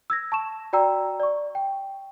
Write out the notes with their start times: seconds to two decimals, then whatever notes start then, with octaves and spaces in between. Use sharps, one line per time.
0.10 E6 G#6 A#6
0.32 A5 C#6 E7
0.73 F#4 D5 G5 A#5 E6
1.20 D5 C#6
1.55 G5